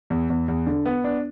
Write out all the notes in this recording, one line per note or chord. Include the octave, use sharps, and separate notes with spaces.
E2
E2
E2
D3
B3
D4